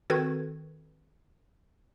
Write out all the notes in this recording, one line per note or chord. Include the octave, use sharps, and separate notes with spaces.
D#3 C4 F#4 A4 B4 G#6